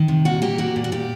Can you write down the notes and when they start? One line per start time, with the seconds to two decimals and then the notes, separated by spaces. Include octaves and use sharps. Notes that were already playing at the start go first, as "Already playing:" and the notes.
Already playing: D#3
0.08 C3
0.25 A#2 F#4
0.42 A#3 G4
0.58 G3 F#4
0.76 A#2
0.84 F#4
0.92 A#2 G4